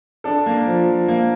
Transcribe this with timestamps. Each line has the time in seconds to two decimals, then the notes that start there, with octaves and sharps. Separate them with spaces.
0.24 D4 A4
0.46 A#3
0.66 F3
0.87 F3
1.08 A#3